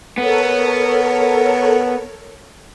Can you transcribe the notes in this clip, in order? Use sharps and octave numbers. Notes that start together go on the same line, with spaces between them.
B3 A4 A#4 C#5